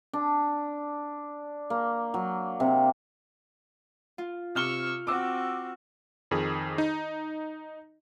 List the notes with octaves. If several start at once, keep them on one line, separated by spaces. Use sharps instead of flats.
D4
A#3
F#3
C3
F4
C3 C#6 E6 F6 G7
C4 F#4 D6 E6
F2 D#3 G#4
D#4